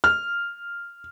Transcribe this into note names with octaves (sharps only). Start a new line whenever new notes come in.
F6